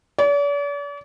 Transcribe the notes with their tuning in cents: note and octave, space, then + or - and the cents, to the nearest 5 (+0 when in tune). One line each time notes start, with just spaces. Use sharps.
D5 -45